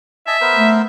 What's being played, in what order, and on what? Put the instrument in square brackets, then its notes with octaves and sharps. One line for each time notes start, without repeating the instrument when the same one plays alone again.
[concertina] D#5 G#5 A5 [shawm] E5
[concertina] B3 A#4 C5
[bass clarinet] A3